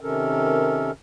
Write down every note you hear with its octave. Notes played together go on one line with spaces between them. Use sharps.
C3 D#3 C#4 A4 A#4